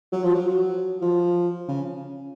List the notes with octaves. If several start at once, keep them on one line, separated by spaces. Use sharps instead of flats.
F#3
F3
F#3
F3
C#3